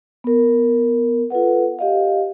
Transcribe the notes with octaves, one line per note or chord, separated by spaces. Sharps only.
B3 A#4
F4 A4 B4 F#5
G4 D#5 F5